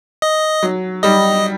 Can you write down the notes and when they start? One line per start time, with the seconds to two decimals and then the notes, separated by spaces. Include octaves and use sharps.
0.22 D#5
0.63 F#3
1.03 G3 D#5